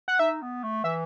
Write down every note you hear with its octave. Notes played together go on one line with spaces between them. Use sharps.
F#5
D#4 E5
B3
A3
E3 E5